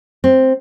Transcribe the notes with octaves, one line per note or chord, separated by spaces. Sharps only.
C4